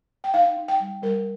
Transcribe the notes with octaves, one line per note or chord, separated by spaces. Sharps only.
G5
D#4 F5
D#4
G5
G3
G3 A#4